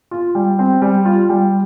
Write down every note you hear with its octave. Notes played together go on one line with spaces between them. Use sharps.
F4
G3
C4
G3
F4
G3